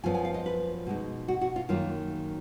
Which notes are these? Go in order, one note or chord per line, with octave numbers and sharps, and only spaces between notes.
F#2 F3 B3 F4 G#5
G#5
F5
D#5
B4
B2 G#3 D#4
F#4
F#4
F4
F#2 D#3 A#3 F4